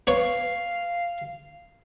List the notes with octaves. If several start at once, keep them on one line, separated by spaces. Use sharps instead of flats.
B3 B4 C#5 F5